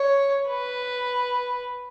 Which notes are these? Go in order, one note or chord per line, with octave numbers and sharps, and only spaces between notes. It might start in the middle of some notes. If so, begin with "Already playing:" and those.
Already playing: C#5
B4